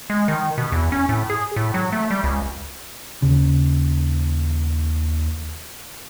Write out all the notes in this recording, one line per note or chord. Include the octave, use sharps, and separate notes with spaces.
G#3
D#3
B2
E2
C#4
A2
G#4
A2
F#3
A3
G3
C#2
D#2 C#3